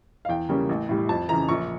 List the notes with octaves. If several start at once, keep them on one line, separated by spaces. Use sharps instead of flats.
F5
E2 G5
C#3 G3 A#3 C#4
A1
A2 G3
F2 A5
C#3 E3 A#5
A#1 C#6